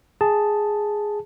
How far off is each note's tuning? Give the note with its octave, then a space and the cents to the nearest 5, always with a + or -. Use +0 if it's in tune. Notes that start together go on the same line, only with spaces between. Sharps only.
G#4 +0 A5 +0